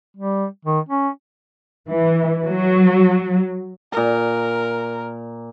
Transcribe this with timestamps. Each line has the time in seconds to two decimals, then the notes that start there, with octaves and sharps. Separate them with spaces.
0.17 G3
0.65 D#3
0.89 C#4
1.88 E3
2.45 F#3
3.92 A#2 A#4 A#5